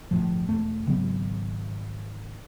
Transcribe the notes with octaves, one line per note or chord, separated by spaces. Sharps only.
G1 C#2 A2 F3
E1 A3
G#1 C#3 F#3 B3